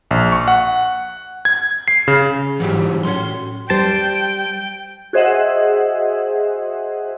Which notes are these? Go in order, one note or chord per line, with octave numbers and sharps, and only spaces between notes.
A#1
C#6
F#5
G#6
C7
C#3
G#2 C#3 E3 F#3 G4
A2 C#4 F#4 C6
G3 C5 G5 A5
F#4 G#4 C5 D#5 E5 F#5